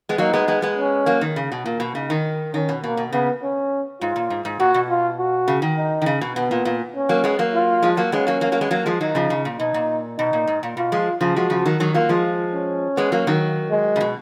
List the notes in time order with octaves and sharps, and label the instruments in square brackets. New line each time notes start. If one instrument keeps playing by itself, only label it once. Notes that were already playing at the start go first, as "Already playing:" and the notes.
[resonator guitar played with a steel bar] G#3 B3
[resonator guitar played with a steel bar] F#3 A#3 [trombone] D#4
[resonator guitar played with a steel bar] G#3 B3
G#3 B3
G#3 B3
[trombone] C#4
[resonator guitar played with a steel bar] F#3 A#3
D#3
C#3
B2
[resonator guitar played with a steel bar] A#2 [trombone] A#3
[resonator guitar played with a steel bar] B2
[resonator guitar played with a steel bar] C#3 [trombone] D#4
[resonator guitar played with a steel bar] D#3
[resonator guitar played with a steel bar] D#3 [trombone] C#4
[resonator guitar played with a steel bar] B2
[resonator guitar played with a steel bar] B2 [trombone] A#3
[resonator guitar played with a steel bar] B2
[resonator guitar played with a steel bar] C#3 [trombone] B3
[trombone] C#4
[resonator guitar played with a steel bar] G#2 [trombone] F4
[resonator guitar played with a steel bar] A#2
G#2
G#2
[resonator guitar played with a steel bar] A#2 [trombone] F#4
[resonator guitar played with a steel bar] B2
[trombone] F4
F#4
[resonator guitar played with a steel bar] C#3
D#3
[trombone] D#4
[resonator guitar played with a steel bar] D#3
C#3
B2
[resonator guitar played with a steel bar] B2 [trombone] B3
[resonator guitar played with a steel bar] A#2
A#2
[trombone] C#4
[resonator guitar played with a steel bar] F#3 A#3
G#3 B3
F#3 A#3
[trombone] F4
[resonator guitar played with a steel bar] F3 G#3
F#3 A#3
[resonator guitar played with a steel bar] G#3 B3 [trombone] C#4
[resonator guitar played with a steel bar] F#3 A#3
F#3 A#3
F#3 A#3
G#3 B3
F#3 A#3
F3 G#3
[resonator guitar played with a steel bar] D#3 F#3 [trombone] D#4
[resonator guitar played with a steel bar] C#3 F3
C#3
A#2
[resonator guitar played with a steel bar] B2 [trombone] D#4
[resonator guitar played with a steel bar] A#2
[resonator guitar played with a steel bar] B2 [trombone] D#4
[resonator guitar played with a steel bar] A#2
G#2
A#2
[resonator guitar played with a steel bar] B2 [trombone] F4
[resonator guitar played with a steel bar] F3 G#3
C#3 F3
[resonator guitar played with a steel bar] F3 G#3 [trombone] F#4
[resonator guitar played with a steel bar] C#3 F3
D#3 F#3
D#3 F#3
[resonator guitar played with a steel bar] F#3 A#3 [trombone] F4
[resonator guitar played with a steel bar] F3 G#3
[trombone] C#4
[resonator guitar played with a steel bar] G#3 B3
F#3 A#3
D#3 F#3
[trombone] G#3
[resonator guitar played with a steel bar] C#3
B2